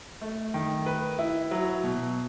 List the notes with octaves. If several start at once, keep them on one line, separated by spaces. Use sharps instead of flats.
A3
D#3
B4
E4
F#3
B2